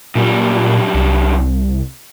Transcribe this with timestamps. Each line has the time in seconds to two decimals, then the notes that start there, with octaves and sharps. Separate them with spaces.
0.15 F#2 A#2 G3
0.94 C2